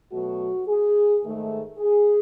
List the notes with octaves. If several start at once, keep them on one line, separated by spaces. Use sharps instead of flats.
B2 F#3 A3 F#4
G#4
G#2 D#3 A3
G#4